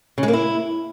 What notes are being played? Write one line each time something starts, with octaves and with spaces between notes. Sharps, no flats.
C#3
G#3
A#3
E4